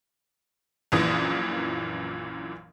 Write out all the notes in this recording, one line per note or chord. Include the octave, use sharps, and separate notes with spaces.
A#1 F#2 A#2 E3 D#6